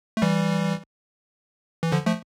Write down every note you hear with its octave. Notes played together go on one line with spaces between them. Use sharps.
A3
E3 G3
E3
D3 F3
F3 A3